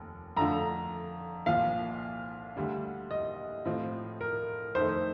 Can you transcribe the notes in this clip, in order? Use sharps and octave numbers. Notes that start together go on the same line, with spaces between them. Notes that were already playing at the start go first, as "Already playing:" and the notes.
Already playing: F1 D#2
F2 D3 A3 D4 F4 A#5
C2 A#2 F3 F5
D2 D3 G3 D4
D#5
A2 F3 C4 F4
A#4
F2 D#3 A3 D#4 C5